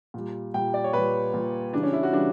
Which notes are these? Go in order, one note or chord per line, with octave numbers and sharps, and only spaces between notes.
A#2 G3
A#2 G3 G5
D5
C#5
A#2 G3 B4
A#2 G3
C#3 E3 G3 D4
C#4
E4
F#4
C#3 E3 G3 D4